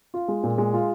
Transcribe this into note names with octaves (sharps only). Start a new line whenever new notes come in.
F4
G#3
A#2
G#3
F4